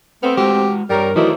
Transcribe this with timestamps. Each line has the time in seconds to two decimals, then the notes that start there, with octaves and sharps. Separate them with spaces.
0.23 A3 B3 C4 F6
0.37 G#3 F#4 G4 B4
0.90 G2 G3 A#4 C#5
1.16 D#3 E3 F#3 A3 D#4 B4 C5 D5